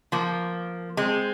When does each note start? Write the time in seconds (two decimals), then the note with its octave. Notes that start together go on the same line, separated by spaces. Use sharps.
0.12 F3 A#3
0.97 G#3 C4